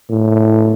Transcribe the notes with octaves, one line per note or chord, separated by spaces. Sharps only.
A2